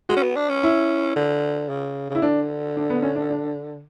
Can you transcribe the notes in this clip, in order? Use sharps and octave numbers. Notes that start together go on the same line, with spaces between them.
G#3 F#4
C#4
B3
D4
C#4
E4
D3
C#3
C#3
E4
D3 D4
D4
B3
C#4
D4
D4